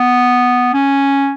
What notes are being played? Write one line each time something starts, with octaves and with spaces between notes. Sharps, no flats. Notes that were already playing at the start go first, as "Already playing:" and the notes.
Already playing: B3
C#4